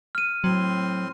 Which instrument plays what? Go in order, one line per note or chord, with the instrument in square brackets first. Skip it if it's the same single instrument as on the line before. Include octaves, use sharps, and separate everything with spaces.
[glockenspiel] F6 D#7
[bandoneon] A2 C4 C6 [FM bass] F#3